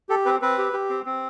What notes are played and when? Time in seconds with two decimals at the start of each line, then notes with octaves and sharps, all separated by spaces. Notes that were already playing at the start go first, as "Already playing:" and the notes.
0.09 G4 A4
0.25 C4 B4
0.42 C4 B4
0.58 G4
0.73 G4
0.90 C4
1.06 C4